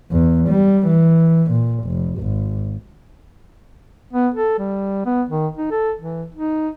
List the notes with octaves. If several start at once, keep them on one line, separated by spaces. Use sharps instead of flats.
E2
G3
E3
A#2
F1
G#1
B3
A4
G3
B3
D#3
D#4
A4
E3
D#4